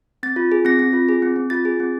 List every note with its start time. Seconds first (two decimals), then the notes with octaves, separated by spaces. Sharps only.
0.23 C4 A6
0.36 F4
0.52 G#4
0.65 C4 A#6
0.79 C4
0.93 F4
1.09 G#4
1.22 C4
1.36 C4
1.50 F4 A6
1.65 G#4
1.80 C4